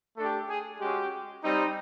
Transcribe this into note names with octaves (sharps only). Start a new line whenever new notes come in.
A3 D4 G4 A4
G#4
G#3 C#4 F#4 G4
G3 C4 D#4